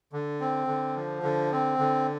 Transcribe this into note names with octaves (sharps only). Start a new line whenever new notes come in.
D3
C4
D3
F3
D3
C4
D3